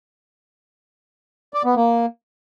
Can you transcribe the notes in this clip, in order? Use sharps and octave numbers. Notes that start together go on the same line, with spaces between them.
D5
B3
A#3